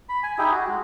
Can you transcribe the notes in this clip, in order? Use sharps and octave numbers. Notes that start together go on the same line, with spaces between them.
B5
G#5
D#4 E4 G4 G#4
F#4
G#3